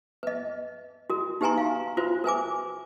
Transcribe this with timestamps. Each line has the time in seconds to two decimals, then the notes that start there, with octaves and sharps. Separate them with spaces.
0.23 B4 D#5
1.10 F#4 A#4
1.41 D#4 G4 B4 G#5 A#5 C6
1.58 F5
1.97 F4 F#4 B4 C5
2.24 A#4 B4 G#5 D6